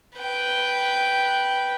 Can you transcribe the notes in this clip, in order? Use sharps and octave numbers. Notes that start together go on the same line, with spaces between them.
B4 G5